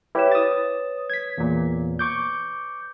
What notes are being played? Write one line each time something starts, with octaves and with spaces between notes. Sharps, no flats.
E4 G4 B4 C#5 E7
D#6 A6
G#6 B6
E2 A#2
C#6 D6 G6